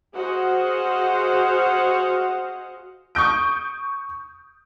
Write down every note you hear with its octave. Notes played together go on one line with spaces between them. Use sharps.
F#4 G#4 C5 D#5 F5 F#5
C#6 D#6 G6 D7